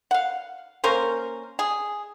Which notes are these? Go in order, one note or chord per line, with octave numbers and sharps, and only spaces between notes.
F5 F#5
A#3 C#4 A#4 C5
G#4